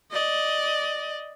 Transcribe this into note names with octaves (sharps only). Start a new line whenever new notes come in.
D5 D#5